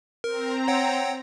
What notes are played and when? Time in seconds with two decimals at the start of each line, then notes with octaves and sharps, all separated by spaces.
0.24 C4 A#4 A#5
0.68 C#5 F#5 G5